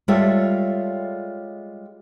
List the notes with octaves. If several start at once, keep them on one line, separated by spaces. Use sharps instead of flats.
G3 G#3 F4 A4 C#5 E5